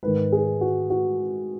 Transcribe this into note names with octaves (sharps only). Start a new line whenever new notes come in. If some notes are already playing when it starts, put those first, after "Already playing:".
G#2 D#3 B4
G#4
F#4
F#4